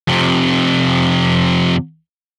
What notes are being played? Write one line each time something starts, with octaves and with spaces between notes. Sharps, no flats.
F2 C3